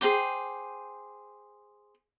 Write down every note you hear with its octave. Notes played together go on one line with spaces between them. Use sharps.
G#4 C5 G5 D6